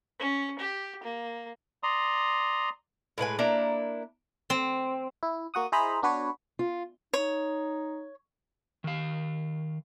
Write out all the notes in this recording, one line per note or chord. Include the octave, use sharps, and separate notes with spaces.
C#4
G4
A#3
D5 A#5 C6 D#6
A2 G#3 B4 G#5
A#3 D4 E4 A#5
C4
E4
A#3 F#4 F#5 D#6
E4 G#4 C5 D#5 A#5 B5
B3 D4 F#4 B4 C#5
F4
D#4 C#5
D#3 F5